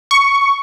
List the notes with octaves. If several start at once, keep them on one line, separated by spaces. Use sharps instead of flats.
C#6